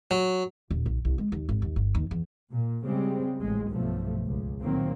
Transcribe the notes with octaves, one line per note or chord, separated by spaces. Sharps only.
F#3
D#1
B1
C2
G#3
D#2
G#1
D#2
G1
D#2
E2
A#2
C#3 G3 G#3 C4
A1 G#3
B1 G2 F3 A3
C#2
A#2 D#3 F#3 A#3 C4